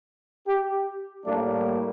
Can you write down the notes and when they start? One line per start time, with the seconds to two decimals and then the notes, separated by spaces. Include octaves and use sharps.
0.47 G4
1.24 A2 G3 A#3 D4